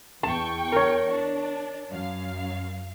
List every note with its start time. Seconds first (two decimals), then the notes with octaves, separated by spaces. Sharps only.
0.23 E2 G5 A5 C#6
0.72 A#4 C#5
1.10 D4
1.90 F#2 F5